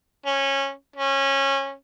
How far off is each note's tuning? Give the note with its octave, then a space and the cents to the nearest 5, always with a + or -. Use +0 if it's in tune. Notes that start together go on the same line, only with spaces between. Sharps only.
C#4 -15
C#4 -20